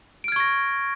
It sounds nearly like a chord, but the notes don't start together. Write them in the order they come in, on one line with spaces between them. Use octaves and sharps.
D7 F6 G#6 C#6 A#6